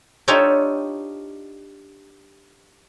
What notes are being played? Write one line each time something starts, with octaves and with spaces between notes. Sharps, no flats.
D4 D#4 F4 G4 A4 C#5